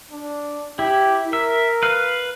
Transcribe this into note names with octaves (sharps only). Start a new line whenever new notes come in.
D4
E4 G4
A#4 E5
B4 F5